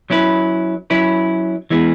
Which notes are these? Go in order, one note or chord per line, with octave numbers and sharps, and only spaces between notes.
F#3 C#4 E4 B4
F#3 C#4 E4 B4
E3 G#3 B3